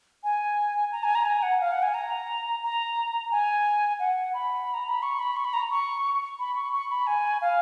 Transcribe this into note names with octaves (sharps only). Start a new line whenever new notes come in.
G#5
A#5
G#5
A#5
G#5
F#5
F5
F#5
G#5
A#5
A#5
G#5
F#5
B5
A#5
B5
C#6
B5
C#6
B5
A#5
C#6
B5
C#6
C#6
B5
G#5
F5